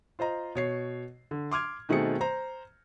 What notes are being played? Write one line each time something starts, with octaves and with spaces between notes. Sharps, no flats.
F4 C5 D#5 A#5
B2 C#5 C7
D3
C6 D6 F6 G#6
B2 D#3 A3 C4 G#4 C#7
C5 A#5